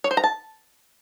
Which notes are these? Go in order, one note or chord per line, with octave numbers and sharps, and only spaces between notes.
C#5
C5
A#5
A5